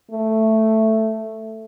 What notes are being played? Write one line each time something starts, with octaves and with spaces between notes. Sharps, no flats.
A3